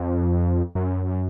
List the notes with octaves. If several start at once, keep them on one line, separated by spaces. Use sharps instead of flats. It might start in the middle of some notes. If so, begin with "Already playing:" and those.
Already playing: F2
F#2